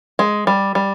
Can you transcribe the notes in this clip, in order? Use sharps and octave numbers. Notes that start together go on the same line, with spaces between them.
G#3
G3
G3